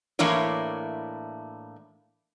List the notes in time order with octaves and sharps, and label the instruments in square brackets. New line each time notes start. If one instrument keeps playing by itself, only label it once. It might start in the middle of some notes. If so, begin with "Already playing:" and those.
[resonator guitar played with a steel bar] A2 E3 A#3 D4 E4 C#5